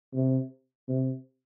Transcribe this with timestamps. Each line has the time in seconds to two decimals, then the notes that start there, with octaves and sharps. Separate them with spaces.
0.15 C3
0.88 C3